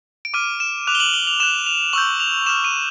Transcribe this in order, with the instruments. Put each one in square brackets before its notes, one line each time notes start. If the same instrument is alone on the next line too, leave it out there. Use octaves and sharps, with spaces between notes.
[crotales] D7
D6 F6 D#7
E7
D6 F#6 F7
G7
F#7
G7
F7
D6 F#6 E7
F7
C#6 E6 G6 F#7
F7
D6 F6 E7
D#7